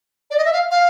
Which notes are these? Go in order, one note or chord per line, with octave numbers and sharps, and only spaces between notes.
D5
D#5
E5
F5
F5